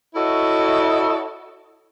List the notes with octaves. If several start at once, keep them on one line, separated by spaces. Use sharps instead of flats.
E4 F#4 A4 C#5 D#5 E5